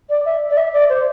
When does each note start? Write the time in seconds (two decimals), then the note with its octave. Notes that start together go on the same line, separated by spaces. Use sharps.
0.10 D5
0.25 E5
0.50 D5
0.57 E5
0.73 D5
0.89 C5